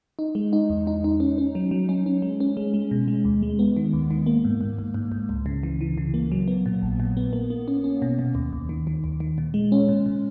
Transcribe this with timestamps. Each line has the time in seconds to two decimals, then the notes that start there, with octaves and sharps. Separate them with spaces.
0.19 D#4
0.35 G#3
0.53 D#4
0.70 E2
0.87 D#4
1.04 D#4
1.20 C#4
1.38 C#4
1.55 F#3
1.71 F#3
1.89 C#4
2.06 C#4
2.22 G#3
2.40 C#4
2.57 G#3
2.74 G#3
2.91 B2
3.08 G#3
3.25 D#2
3.43 G#3
3.59 B3
3.77 D#3
3.93 D#2
4.11 D#3
4.26 A#3
4.45 G#2
4.61 G#2
4.79 G#2
4.94 G#2
5.12 G#2
5.29 C#2
5.46 C#3
5.63 E3
5.81 E3
5.98 C#3
6.14 A#3
6.32 F#3
6.48 B3
6.66 A#2
6.82 A#1
7.00 A#2
7.17 B3
7.33 A#3
7.50 A#3
7.68 C#4
7.84 C#4
8.02 B2
8.19 B2
8.35 D#2
8.53 D#2
8.69 D#3
8.87 D#3
9.04 D#2
9.20 D#3
9.38 A#2
9.54 G#3
9.72 C#4
9.88 A#2
10.06 A#2